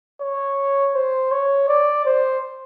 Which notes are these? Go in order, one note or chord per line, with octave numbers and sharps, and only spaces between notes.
C#5
C5
C#5
D5
C5